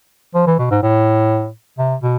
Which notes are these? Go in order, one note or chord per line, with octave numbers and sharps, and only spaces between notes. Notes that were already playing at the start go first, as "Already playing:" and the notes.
F3
E3
B2
G#2
A2
C3
B2